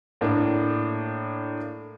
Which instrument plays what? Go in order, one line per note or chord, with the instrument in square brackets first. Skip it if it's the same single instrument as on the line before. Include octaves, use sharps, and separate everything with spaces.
[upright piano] A2 A#3 D4